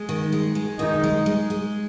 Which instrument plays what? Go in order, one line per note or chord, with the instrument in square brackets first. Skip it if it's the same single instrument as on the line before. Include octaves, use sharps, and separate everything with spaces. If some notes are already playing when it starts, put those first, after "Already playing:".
Already playing: [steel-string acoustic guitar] G#3
D#3
G#3
G#3
[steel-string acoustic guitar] D#3 [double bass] D#4
[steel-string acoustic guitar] G#3
G#3
G#3